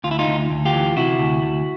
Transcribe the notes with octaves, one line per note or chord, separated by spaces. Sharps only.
D2 F4
E4
D#4 F4
D2
D2
F4 G4
E3
C3 E4 F#4
D2
D2